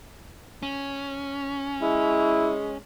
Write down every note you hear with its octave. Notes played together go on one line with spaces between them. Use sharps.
C#4
G#3 E4